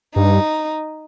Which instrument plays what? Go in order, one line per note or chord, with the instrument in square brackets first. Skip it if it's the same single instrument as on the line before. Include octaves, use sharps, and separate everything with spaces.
[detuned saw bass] G2 [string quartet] D#4